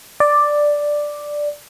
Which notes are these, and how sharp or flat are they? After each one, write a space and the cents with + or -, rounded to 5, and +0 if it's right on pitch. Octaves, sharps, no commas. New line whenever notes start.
D5 +5